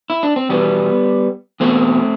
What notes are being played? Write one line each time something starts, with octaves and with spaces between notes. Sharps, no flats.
E4
D4
C4
E2 B2 G3 B3
E2 B2 A3 C4